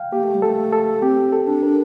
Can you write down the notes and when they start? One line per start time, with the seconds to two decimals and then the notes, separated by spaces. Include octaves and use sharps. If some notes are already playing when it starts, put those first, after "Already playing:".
Already playing: F5 G5
0.12 A#3 G4
0.23 A3
0.34 G3
0.42 A3 A4
0.73 A4
1.02 C4 G4
1.33 A4
1.47 D4
1.63 A#4